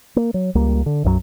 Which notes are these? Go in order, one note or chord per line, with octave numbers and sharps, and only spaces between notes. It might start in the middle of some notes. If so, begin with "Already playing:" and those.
A#3
F#3
C#2 G3 A#3
D3
B1 F#2 E3 F#3